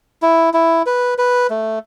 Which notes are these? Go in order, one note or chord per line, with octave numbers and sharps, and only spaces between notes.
E4
E4
B4
B4
A3